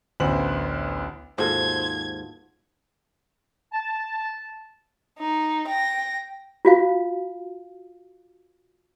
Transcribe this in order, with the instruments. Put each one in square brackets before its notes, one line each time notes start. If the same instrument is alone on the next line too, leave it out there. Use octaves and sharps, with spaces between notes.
[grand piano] A1 D2 B3 C5 F#7
[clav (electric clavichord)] D#2 G#2 [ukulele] F4 F#4 A4 [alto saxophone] C5 [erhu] G#6
[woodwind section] A5
[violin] D#4
G5 A#6
[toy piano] F4 F#4 F5